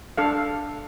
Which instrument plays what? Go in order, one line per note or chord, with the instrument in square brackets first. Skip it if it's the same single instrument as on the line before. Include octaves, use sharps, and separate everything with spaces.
[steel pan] D4 A4 F5